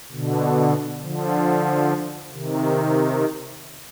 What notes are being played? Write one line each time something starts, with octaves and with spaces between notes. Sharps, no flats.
B2 D3
D3 F3
C3 D#3